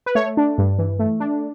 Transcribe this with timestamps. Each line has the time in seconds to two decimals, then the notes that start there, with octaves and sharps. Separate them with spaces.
0.06 B4
0.15 A3 C#5
0.37 D4
0.58 G2
0.79 E3
0.99 A3
1.20 D4